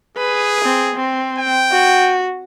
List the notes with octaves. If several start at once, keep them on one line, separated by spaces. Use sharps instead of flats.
G#4 B4
C4
C4
G5
F#4